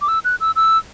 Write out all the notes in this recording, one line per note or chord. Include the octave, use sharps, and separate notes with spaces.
D6
E6
F#6
E6
E6